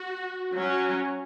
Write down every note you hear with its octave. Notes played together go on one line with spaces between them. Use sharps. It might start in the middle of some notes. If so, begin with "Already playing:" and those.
Already playing: F#4
F#3 C#4